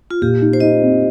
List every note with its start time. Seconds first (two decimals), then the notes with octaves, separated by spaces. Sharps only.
0.11 F4
0.22 A#2 G4
0.42 D#4
0.53 C5
0.60 D#4 D#5
0.81 C4